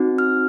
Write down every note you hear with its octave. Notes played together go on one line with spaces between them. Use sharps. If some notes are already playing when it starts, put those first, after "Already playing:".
Already playing: C4 D#4 F#4
F6